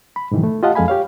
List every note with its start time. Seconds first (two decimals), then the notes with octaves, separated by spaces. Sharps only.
0.16 B5
0.31 G#2 B2 D#3 E3 F#3
0.44 A3
0.63 F4 G4 D#5 F5 F#5 A5
0.75 F2 G#3 A4 F5 G#5 B5
0.88 G4 C#5 F5